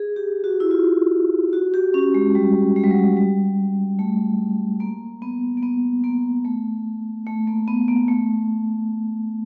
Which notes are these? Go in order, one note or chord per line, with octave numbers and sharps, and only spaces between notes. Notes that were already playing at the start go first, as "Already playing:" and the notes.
Already playing: G#4
G4
F#4
E4
F4
F#4
G4
C#4
G#3
G3
G#3
G3
F#3
G3
G3
A3
A#3
B3
A#3
B3
A#3
A3
A3
A#3
B3
A#3
A3